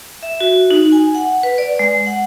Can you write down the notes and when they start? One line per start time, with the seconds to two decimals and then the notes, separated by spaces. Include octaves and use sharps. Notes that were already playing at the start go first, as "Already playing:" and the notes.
0.23 E5
0.41 F#4
0.71 D#4
0.92 G#5
1.15 F#5
1.43 B4
1.58 D5
1.79 G#3
2.07 F#5